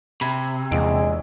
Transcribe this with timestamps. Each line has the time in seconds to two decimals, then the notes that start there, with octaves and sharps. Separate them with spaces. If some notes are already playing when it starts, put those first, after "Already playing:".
0.21 C3 B5 G#6
0.72 A#1 E2 G#3 D7